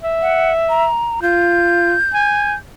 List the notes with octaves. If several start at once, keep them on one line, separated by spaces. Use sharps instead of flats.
E5
F#5
A#5
F4 G6
G#5